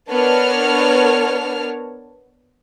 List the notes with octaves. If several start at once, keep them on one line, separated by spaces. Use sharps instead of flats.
B3 D4 A#4 C#5 A5 F6